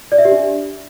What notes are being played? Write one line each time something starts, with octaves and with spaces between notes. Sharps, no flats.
D5
E5
G4
D4